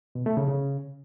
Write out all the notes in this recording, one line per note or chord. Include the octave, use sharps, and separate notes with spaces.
B2
A3
C#3
C#3